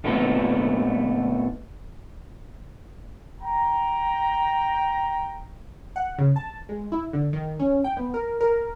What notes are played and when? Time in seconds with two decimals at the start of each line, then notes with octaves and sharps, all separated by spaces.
0.04 A#2 A3 B3 C4 D#4 A4
3.42 G5 A#5
5.96 F#5
6.18 C#3
6.36 A5
6.69 G#3
6.92 E4
7.13 D3
7.33 D#3
7.60 C#4
7.84 G5
7.97 B3
8.14 A#4
8.41 A#4